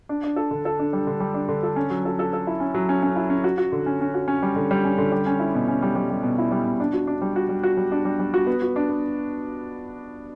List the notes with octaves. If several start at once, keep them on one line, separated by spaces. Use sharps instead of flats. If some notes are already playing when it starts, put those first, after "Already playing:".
D4
D4
A4
D3
A4
D4
G3
D3
G3
D4
D3
A4
C#4
F#3
A4
A4
A4
E4
C#4
F#3
C#4
C#4
E4
C#4
F#4
F#4
D3
C#4
C#4
F#4
C#4
G3
D3
G3
C#4
D3
G3
C#4
E4
B2
C#4
G3
G3
G3
B2
E4
G3
B2
D4
F#4
D4
G3
F#4
G3
F#4
G3
D4
G3
G3
F#4
B3
F#4
D4
B3